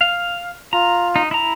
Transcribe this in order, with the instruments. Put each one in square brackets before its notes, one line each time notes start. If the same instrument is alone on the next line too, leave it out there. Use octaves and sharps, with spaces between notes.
[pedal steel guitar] F5
[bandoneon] F4 [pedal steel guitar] A#5
[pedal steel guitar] D#4
E4 A#5